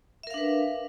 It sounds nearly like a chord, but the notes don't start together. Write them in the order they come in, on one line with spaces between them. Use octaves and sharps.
E5 A#4 F5 D4 B4